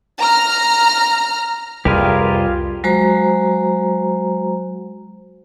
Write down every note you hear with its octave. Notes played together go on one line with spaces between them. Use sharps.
A#5 F6
C2 F2 F4 G4 G#4 A#4 B4
F#3 G#3 F#4 C5 A#5